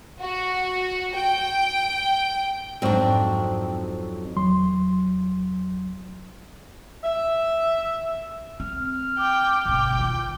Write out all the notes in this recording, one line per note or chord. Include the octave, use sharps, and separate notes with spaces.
F#4
G5
F2 G#2 F#3 C4 D4
E2 F#3 C6
E5
C4 F6
G5 D6
G1 B2 G5
D#3 F4